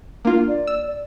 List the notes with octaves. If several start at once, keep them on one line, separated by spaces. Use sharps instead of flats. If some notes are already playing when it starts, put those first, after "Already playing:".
A#3 D4 F4
D5
E6
D5